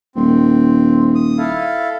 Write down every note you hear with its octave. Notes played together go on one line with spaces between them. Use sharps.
D#1 C4
D#6
E4 A4 F5